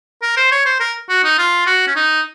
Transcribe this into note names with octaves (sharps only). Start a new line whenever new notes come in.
A#4
C5
C#5
C5
A#4
F#4
D#4
F4
F#4
C#4
D#4